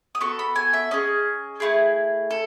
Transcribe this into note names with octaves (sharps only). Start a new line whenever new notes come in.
D#6
B3 F#4 A4 C#6
B5
G#5
E5
C#4 G#4 D#5
A3 E4 G#4
A4